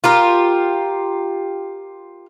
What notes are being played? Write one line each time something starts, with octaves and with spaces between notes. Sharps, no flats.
F4 G4 A#4